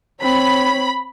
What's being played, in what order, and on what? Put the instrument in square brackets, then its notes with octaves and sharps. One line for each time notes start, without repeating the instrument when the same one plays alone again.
[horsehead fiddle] C4 C#5 [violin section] B5